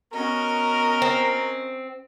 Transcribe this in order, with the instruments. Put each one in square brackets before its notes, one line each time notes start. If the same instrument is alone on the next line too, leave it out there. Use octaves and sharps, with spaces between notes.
[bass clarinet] B3 [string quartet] C#4 F#4 D#5 [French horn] A#4
[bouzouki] C4